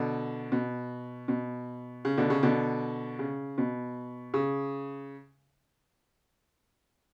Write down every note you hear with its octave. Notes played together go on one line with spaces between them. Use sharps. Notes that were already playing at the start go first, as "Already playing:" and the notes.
Already playing: B2 D3
B2
B2
C#3
B2 D3
C#3
B2 D3
C#3
B2
C#3